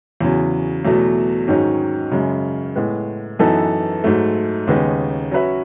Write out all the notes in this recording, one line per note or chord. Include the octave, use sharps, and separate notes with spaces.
E2 C#3 F#3
E2 B2 F#3 A3
G#2 D#3 F#3 C#4
F#2 C#3 G#3
A2 G#3 B3
F#2 E3 B3 D#4 A4
G#2 F#3 A3
D#2 C#3 G#3 B3 D#4
F#3 C#4 F#4 B4 E5